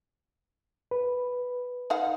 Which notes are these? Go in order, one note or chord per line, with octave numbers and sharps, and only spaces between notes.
B4
D#4 F5 F#5